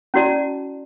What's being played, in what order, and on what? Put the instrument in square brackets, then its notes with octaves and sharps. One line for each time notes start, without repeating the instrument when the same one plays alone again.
[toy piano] C#4 E4 F#4 D5 A5